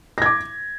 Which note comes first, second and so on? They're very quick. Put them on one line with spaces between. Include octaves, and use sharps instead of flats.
A#6 G#6 D6